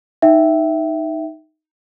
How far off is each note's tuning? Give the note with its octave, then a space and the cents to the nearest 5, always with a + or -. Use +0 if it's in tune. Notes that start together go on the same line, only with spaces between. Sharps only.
D#4 +0 E5 +0 G5 -30